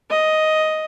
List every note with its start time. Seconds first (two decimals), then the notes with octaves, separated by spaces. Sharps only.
0.11 D#5